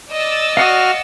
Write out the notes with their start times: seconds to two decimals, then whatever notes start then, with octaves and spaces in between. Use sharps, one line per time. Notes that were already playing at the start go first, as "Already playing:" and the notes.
0.12 D5 D#5 E6 A6
0.57 F#4 F5 F#5 D#6 F6